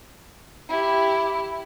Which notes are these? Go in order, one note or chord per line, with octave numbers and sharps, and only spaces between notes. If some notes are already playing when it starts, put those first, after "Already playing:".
E4 G4